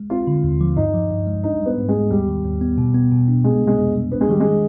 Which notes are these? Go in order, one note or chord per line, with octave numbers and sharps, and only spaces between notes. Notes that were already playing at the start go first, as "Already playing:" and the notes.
Already playing: G#3
C4 F4
D3
D#2
F3
G2 D#4
F3
G2
G#3
D4 D#4
G3 B3
G#2
G#3
B3
D#2 G3
D#3
D#2
B3
B2
B3
B2
D4
G#3 B3
C3
G#3
F2
G3
B3 D4
G#3
D#3 G3
G#3